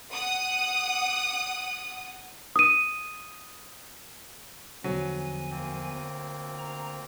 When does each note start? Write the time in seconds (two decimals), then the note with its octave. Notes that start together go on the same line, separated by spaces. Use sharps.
0.12 F#5 D#6
2.56 D#6 D#7
4.84 E2 D3 F3 F#3 G#5
5.50 D2 A#3 C4
6.59 A#5